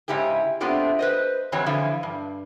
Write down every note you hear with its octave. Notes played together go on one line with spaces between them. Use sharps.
G#2 C#3 E4 G4 G#4
A3 B3 C4 D4 F4 G4
B4 C5 D#5
F2 E3 F#3 C4 C#5
D3 E3 F3 E4 F5
G2